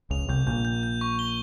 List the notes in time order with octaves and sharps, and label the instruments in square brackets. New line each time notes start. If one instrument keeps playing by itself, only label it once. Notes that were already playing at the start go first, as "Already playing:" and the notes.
[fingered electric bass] C#2 C#3 [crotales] F7
[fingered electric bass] C2 C3 [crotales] G6
[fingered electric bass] A#1 A#2 [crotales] G6
[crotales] G6
G6
C#6
G7